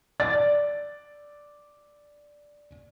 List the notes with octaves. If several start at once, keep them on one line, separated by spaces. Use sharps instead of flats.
D5 A6